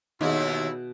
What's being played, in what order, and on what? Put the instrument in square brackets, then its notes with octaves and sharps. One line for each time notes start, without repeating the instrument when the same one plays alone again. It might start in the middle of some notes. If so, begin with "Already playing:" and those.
[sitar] D#2 [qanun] B2 E5 [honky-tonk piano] D#4 G#4 [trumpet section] E4